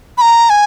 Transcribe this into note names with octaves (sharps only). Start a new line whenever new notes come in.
B5
A#5
G#5